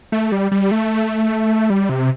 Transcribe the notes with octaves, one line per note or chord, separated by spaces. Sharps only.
A3
G3
G3
A3
G3
C3